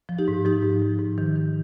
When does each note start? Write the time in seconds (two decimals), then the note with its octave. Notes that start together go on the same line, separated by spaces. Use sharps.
0.09 F3
0.18 D#4 G4
0.28 G#2
0.45 F3 D#4 G4
0.63 G#2
0.82 F3
0.99 G#2
1.18 D#3
1.36 D#3